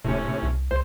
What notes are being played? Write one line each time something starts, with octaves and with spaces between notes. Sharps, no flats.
D#1 A2 C3 C#4
C2
C#2 C5